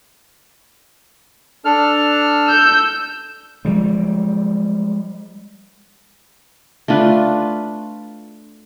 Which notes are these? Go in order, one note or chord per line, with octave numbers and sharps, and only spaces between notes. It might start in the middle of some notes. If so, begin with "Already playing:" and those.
D4 A4 F6
E6 G6
F3 G3 G#3
A3 D4 F4 B4